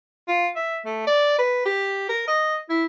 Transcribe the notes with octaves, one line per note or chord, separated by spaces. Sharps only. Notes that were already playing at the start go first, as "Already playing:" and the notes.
F4
E5
A3
D5
B4
G4
A#4
D#5
E4